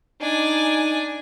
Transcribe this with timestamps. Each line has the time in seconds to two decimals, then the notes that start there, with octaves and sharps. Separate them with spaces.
0.21 D4 D#4 G#5